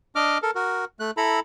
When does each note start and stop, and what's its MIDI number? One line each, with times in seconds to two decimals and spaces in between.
0.15 0.38 62
0.15 0.38 75
0.15 0.38 86
0.15 0.38 89
0.42 0.51 69
0.42 0.51 70
0.55 0.85 66
0.55 0.85 70
1.00 1.11 57
1.00 1.11 90
1.17 1.40 64
1.17 1.40 69
1.17 1.40 82
1.17 1.40 83